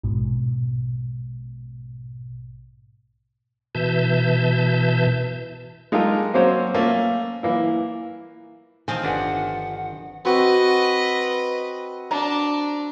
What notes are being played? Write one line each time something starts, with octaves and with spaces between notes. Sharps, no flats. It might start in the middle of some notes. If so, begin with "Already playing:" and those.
A#1 G#2 B2
B2 E3 E5 A5 G6
G#3 D#4 F4 G4 A4 A#4
F#3 A#3 C4 C#4 C5 C#5
A3 A#3 C#4 F4
E3 A#3 E4
D#3 F3 C4 G#5
G1 D4 B4 F#5
C4 F#4 B4 D#5
D4 A#5